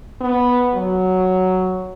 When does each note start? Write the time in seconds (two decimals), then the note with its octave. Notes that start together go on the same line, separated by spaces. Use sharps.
0.21 B3
0.75 F#3